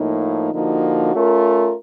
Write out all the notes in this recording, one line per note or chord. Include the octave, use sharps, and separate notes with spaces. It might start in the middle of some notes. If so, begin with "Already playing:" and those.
Already playing: A2 F3 A#3 D#4
D3 F3 A#3 D#4 F#4
A3 C#4 F4 A#4